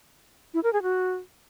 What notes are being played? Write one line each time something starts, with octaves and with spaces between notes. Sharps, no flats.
E4
A#4
G#4
F#4